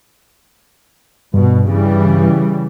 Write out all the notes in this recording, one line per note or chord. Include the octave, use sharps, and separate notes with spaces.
G2 B2
C#3 E3 G3